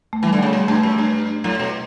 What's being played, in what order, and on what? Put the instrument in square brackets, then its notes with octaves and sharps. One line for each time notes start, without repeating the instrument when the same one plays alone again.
[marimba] A3
[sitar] E3 [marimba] G3
[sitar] D3
[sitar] C#3 [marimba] F#3
[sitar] B2 [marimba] G3
[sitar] G2 [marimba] A3
[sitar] F#2
G2
[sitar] A2 [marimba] F#3
[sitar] B2